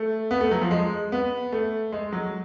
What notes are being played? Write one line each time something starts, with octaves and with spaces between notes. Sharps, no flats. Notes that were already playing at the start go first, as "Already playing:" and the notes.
Already playing: A3
B3
A3
F#3
F3
G#3
B3
A3
G#3
F#3